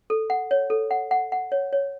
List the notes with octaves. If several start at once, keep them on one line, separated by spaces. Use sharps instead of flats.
A4
F#5
C#5
A4
F#5
F#5
F#5
C#5
C#5